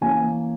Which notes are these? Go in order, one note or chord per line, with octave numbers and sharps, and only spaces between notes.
E3 A#3 C#4 G#5